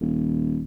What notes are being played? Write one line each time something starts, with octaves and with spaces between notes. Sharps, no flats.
D#1